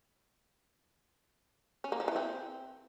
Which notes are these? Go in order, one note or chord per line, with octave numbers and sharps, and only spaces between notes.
C#4
A#3
F3
E3
C4